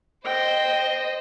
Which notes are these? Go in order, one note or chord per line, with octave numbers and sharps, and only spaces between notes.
C5 D#5 G5